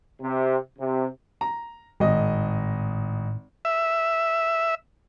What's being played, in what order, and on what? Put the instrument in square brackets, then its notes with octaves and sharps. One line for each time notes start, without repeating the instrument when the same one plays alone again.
[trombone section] C3
C3
[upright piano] A#5
[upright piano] G#1 D#5 [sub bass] A2
[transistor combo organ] E5